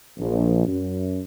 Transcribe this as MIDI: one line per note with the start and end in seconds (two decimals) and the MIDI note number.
0.18 0.62 34
0.66 1.19 42